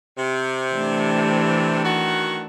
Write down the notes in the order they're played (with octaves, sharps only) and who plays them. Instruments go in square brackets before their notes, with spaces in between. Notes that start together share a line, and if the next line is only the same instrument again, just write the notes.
[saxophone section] C3
[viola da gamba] E3 A3 D4
[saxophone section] D#3 F#4